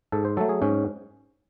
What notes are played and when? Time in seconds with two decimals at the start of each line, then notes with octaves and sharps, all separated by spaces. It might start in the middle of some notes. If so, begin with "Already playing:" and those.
0.12 G#2 A4
0.25 C5
0.37 F#3 A3 A4
0.49 G#4
0.62 G#2 C#4